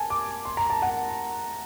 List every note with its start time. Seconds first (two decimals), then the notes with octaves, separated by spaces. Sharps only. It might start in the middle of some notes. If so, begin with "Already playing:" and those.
Already playing: G#5 A5
0.10 D6
0.45 C6
0.57 A#5
0.70 A5
0.82 F#5